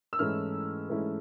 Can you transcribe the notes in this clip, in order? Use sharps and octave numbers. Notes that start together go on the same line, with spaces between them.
E6
G#2 E3 A3 C#4 E4 F6
G#2 E3 A3 C#4 E4